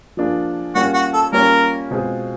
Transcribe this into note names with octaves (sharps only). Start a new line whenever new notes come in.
F3 A#3 D4 F4 G#4
G3 A#3 C#4 F4 F#4
F#4
A4
G3 A#3 C#4 F4 A#4
B2 G#3 C4 F4 G#4